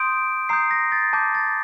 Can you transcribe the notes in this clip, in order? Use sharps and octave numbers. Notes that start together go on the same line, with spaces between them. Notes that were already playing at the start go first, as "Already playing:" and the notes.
Already playing: C6 D#6 G6 D7
A#5 D#6 G6 C7
A#6
A6
A5 D6 G6
A6